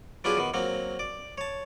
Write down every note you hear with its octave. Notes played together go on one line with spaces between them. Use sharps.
F#3 B3 D4 F4 G4 G#4
D#3 B3
F#3 A#3 C4
D5
C#5 A5